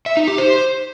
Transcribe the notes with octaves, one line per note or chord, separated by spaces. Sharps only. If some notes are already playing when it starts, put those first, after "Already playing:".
E5
D#4
G4
C5